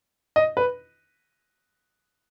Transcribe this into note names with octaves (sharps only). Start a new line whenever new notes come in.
D#5
B4